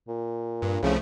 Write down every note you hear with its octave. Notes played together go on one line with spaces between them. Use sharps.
A#2
G2
C2 C#3 F3 A3